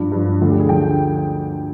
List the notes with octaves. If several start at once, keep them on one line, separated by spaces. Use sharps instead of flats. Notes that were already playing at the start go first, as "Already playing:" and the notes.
Already playing: G2 F3 D4
G2 F3
D2 D3 F3 F4
G4
G#4
D3 F3 G5